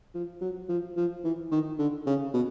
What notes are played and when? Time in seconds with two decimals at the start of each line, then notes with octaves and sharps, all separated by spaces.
0.15 F3
0.41 F#3
0.69 F3
0.97 F3
1.24 E3
1.51 D#3
1.79 D3
2.06 C#3
2.34 B2